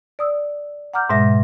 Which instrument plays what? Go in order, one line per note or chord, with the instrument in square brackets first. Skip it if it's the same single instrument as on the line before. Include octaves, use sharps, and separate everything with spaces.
[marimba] D5 D#6 E6
F#5 A#5 D6 F6 G6
G#2 B2 G#3 E5 A#6